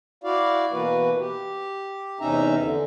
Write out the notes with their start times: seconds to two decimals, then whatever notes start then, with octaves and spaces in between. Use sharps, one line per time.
0.24 E4 F#4 D5 F5
0.72 B2 E3 A#3 F#4 B4
1.19 G4
2.20 E2 C3 C#4 D#4 E5 A#5
2.58 D3